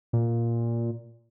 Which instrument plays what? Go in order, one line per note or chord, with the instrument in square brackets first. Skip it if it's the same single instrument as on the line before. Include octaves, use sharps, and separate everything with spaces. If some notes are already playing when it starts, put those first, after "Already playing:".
[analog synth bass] A#2